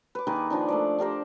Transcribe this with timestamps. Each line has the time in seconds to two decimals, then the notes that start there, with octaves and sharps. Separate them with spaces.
0.15 B4 D6
0.27 D#3 A#3 G#4 B4
0.50 F3 D4 D#4
0.69 A3 C5 D5
0.98 D4 G4 A#4 C5